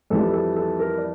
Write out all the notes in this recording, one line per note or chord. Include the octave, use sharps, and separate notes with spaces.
F2 E3 G3 A4
A4
A4
A#4
D5